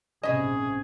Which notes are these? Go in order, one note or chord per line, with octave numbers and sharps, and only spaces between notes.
A#1 G#2 C3 C#4 G#4 D#5 B5